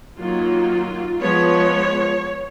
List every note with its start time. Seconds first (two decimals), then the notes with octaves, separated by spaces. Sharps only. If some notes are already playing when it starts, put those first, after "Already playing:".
0.18 D#3 F#3 A#3 F4
1.20 F3 G#3 B3 C#5